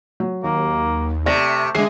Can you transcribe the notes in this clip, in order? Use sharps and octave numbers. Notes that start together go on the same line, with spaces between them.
F#3
D#2 A#3
C3 A3 D5 A#6
D3 F#3 G#3 G#4 E5 C7